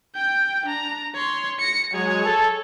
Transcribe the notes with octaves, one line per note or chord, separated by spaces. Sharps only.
G5 G6
D4 A#5
C#5 C6
A#6 C#7
F#3 G#3 G#4 C#5
A4